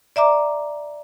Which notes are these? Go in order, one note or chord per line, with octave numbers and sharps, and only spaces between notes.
D5 E5 A#5 D6